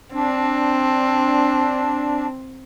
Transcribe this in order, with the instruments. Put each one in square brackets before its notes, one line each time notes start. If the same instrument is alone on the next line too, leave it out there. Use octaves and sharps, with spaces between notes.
[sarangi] C4 [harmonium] D4